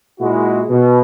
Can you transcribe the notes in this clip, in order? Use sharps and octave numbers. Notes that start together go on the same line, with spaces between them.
A#2 G#3 E4 F#4
B2